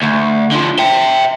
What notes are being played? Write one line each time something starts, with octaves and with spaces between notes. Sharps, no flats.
D2
D3 F3
E5 G5